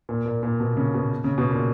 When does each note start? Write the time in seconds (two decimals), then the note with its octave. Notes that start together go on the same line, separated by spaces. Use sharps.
0.09 A#2
0.26 A#2
0.43 A#2
0.60 B2
0.77 C#3
0.94 B2
1.24 C#3
1.38 B2
1.51 A#2